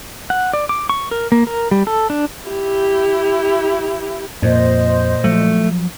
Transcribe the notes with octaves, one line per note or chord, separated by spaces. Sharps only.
F#5
D5
D6
C#6
A#4
A#3
A#4
G3
A4
D4
E4 G4
F2 A#2 C5 D#5
F3 F#3 A3